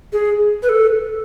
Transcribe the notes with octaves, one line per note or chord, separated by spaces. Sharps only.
G#4
B4
A4